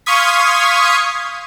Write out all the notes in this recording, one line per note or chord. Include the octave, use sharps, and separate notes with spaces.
F5 C6 C#6 D#6 G#6 B6